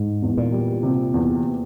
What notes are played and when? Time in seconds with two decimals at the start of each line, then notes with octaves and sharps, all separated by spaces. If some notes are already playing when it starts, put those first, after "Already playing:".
Already playing: G#2
0.22 E2
0.37 A#2
0.52 G3
0.83 C3
1.14 E2